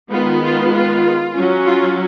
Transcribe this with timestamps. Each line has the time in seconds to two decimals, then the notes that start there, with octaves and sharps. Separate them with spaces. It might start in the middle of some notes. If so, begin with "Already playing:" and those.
0.11 D#3 G#3 B3 F4
0.42 F4
0.73 F4
1.34 F#3 C#4
1.66 F4